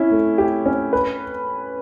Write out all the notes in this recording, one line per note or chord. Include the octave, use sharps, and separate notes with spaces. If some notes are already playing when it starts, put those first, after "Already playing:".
Already playing: C#4 E4
A3
G4
C#4
B4